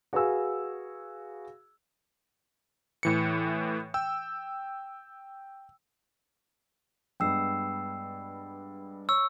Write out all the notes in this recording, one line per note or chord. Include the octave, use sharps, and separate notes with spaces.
F#4 G#4 B4 F5 G#5 E6
A2 E3 C#7
G5 E6
G2 G#3 B3 G5 E6 C7
C#5 C#6 E6